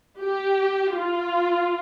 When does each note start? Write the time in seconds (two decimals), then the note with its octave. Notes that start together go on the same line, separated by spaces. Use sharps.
0.19 G4
0.95 F4